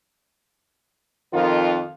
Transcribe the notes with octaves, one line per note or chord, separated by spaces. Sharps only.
F2 D#3 F4